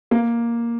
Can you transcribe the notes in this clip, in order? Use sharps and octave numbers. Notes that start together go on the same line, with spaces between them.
A#3